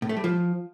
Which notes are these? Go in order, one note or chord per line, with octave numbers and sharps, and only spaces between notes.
A2
A3
G3
F3